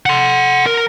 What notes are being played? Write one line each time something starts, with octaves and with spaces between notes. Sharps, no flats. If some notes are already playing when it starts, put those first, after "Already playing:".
F#5 C6
A#4